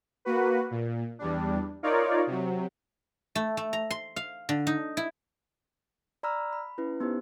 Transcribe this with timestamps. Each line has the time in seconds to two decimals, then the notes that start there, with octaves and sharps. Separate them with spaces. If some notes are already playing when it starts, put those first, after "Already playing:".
0.25 A#3 F#4 B4
0.71 A#2
1.19 E2 G3 D4
1.83 D#4 F4 A#4 C#5 D5
2.27 C3 F#3
3.35 A3
3.57 A3
3.73 A#5
3.91 C6
4.16 F5
4.49 D3
4.67 D#4
4.97 E4
6.23 D5 A#5 B5 E6 F6
6.53 B5
6.78 C#4 E4 B4
7.00 B3 D#4 G4 C5